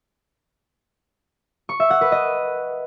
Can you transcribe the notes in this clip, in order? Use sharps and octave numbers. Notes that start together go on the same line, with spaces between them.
C#6
E5
F#5
B4
D#5